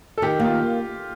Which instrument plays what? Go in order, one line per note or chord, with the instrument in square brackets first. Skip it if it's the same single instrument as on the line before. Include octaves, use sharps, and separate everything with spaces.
[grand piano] A4
[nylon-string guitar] D#3 [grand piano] G4
[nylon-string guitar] A#3
[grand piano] F4